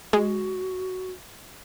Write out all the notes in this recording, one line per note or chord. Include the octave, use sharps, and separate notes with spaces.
G#3 F#4